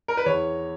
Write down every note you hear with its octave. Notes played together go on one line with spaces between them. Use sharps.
A#4
B4
E2 C#5